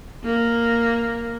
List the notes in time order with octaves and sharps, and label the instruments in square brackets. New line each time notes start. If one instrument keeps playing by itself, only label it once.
[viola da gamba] A#3